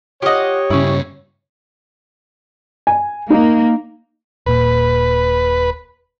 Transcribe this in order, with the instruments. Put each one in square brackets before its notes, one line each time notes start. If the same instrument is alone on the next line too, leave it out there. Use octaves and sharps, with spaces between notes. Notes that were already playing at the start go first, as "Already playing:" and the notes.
[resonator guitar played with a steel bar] F4 F#5 [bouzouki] G4 D#5 [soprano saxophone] C#5
[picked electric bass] G2 C#3 [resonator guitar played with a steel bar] C#4 E4
[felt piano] G#5
[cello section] A#3 [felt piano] D#4
[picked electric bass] D#1 A#2 [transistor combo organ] B4